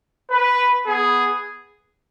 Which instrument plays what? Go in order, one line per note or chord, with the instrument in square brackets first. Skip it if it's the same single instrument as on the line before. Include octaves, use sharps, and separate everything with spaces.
[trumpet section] B4
B3 G#4